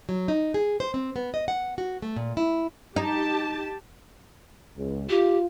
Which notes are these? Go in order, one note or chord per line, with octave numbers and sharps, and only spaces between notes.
F#3
D#4
G#4
C5
C4
B3
D#5
F#5
F#4
A3
A#2
E4
D#4 G4 A5
C#2
F4 G4